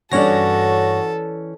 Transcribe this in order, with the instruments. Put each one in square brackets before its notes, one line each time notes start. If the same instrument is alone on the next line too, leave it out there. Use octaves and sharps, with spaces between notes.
[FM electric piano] G2 C#5 A#6 [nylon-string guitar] E3 C#4 D5 [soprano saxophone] F#4 [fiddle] A4